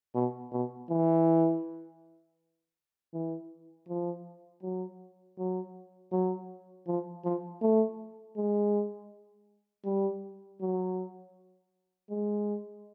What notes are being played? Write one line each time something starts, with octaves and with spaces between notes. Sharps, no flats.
B2
B2
E3
E3
F3
F#3
F#3
F#3
F3
F3
A3
G#3
G3
F#3
G#3